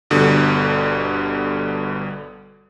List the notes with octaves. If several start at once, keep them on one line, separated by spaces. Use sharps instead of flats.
G1 B2 D3 G3 A4